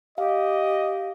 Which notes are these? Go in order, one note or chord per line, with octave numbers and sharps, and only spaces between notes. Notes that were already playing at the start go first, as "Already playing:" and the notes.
G4 D#5 F5